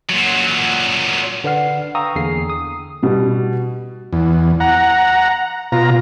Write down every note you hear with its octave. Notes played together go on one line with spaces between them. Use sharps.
A#2 F#3
D3 B4 D5 F#5 F6 C7
F5 G5 A#5 C#6 D#6 E6
E2 D3 A#3 G#4 C7
D#6
B2 G3
E2
F#5 A#5
B2 F4 A#5